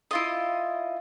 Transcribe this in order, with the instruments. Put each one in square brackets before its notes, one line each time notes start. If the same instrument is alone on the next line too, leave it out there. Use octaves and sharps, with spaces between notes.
[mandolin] E4 F4 D#5